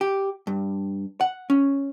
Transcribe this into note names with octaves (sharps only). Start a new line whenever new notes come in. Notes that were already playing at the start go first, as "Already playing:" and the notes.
G4
G2
F#5
C#4